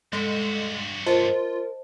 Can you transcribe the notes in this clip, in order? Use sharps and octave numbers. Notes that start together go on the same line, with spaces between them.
G2 G#3 F#4 A4
F4 A#4 C5 D#5 A5